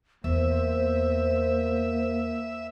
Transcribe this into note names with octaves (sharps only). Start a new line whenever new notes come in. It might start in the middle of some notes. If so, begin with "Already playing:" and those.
E2 A#3 B3 C5 E5